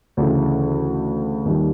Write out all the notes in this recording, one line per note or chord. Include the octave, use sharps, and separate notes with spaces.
D2 C#3 E3
D#2 D#3 G3